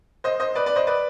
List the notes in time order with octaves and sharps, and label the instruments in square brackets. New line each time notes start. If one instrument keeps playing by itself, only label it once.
[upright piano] C5 D#5
C5 D#5
B4 D5
B4 D5
C5 D#5
B4 D5